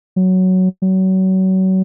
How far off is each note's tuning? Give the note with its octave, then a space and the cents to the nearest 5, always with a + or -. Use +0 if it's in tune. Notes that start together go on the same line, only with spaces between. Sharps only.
F#3 +5
F#3 +30